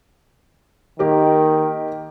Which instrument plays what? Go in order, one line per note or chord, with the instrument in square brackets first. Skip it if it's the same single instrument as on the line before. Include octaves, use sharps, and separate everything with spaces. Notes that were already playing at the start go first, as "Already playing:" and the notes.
[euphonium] D#3 [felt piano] A#3 G4 A#4